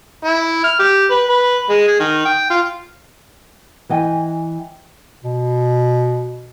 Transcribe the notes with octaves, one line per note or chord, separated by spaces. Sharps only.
E4
F6
G4
B4
B4
G#3
G#4
D#3
G5
F4
E3 D#5 G5 G#5
B2